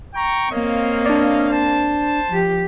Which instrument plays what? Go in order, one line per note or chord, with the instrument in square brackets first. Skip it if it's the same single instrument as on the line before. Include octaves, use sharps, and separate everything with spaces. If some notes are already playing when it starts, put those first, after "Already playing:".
[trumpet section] G5 A#5 C#6
[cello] A#3 C4 [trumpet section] C#5 D#5 F5
[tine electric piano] D4 D5
[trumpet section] C5 A5
[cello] F3 G4